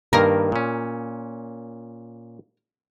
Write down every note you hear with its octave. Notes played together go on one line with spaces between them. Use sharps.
G2 D#3 A#3 A#4
A#2 C#4